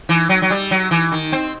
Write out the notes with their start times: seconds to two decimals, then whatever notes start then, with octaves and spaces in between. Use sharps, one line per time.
0.09 E3
0.29 F#3
0.42 F#3
0.50 G3
0.71 F#3
0.91 E3
1.12 D#3
1.32 C4